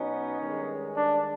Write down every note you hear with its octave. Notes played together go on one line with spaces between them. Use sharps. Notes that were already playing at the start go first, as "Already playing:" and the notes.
Already playing: B2 F#3 B3 C#4 D#4
G2 D#3 G#3
D4